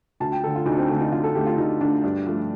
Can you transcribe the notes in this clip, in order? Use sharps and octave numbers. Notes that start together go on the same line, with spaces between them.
D2 A5
G5
D3 A3 A4
F4
D2 D#4
D4
C4
D3 A3
D#4
D2 F4
A4
D3 A3 G4
F4
D2 D#4
D3 A3 D4
G2
F3 A3